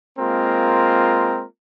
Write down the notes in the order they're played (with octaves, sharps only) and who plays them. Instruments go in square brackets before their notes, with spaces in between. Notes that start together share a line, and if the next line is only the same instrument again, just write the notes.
[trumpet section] G#3 A#3 C4 F4 A#4